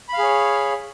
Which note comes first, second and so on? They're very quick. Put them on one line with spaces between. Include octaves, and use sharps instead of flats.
B5 F5 G#4 C#5